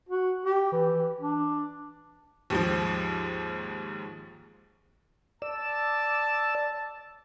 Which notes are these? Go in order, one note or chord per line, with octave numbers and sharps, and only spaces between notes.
F#4
G4
E3
D4
D#2 G#2 F3
D5 A5 E6